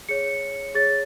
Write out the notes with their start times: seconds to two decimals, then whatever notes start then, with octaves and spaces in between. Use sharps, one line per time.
0.09 G#4 C#5 C#7
0.75 G#4 C#5 A6